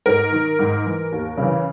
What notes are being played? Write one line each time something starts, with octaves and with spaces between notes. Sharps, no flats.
G#2 A#4
D#3
G#2
E3
D#2
C#3
E3